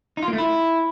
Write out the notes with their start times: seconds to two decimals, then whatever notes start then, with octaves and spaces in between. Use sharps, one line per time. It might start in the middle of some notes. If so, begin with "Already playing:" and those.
0.17 D#4
0.23 F4
0.28 A#3
0.33 A3
0.38 E4